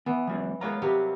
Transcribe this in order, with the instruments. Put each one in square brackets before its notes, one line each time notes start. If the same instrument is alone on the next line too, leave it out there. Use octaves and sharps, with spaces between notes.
[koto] E3 [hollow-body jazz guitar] B3
[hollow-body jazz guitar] F3 G3 C4
[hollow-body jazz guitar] G#3 C#5 A#5 [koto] A#3 B3 F4
[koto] C3 F#3 G3 [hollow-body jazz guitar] G4